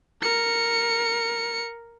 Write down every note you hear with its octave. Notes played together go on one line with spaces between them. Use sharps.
A#4 C#7